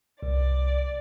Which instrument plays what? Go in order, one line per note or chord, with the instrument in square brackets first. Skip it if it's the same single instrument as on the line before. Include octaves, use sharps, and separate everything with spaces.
[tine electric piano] C2 [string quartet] D5